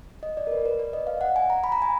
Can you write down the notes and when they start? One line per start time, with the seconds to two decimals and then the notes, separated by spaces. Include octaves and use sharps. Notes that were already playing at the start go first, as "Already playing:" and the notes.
0.23 D#5
0.37 D5
0.47 A#4
0.52 B4
0.66 B4
0.80 D5
0.93 D#5
1.07 F5
1.21 F#5
1.36 G#5
1.50 A#5
1.64 B5
1.72 A#5
1.82 G#5